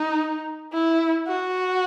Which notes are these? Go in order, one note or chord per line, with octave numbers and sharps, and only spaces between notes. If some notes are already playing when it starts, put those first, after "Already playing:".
Already playing: D#4
E4
F#4